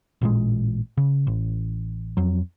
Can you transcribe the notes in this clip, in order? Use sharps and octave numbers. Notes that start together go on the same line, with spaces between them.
A1 A#2 G#3
C#3
A1
F2 F#3